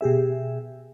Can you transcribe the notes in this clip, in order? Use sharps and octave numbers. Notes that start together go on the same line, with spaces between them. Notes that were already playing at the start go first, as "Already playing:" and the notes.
B2 G4 G#4 E5